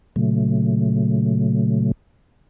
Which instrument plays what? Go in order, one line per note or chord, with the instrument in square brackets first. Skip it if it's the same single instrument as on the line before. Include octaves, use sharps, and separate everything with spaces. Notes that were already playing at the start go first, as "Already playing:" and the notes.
[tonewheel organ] A#2 C#3 F#3 A3